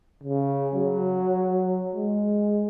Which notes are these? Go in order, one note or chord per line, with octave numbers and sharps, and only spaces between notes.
C#3
F#3
G#3